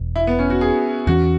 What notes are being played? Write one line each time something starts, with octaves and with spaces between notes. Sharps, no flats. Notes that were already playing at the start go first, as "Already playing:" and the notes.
Already playing: E1 E2 B2
E4
B3
C#4
F#4
G#4
E2 E3 C#4 F#4